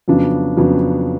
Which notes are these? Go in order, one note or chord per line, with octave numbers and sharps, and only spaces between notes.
F2 C#3 F#3 B3 D4
F2 C#3 F#3 B3 D4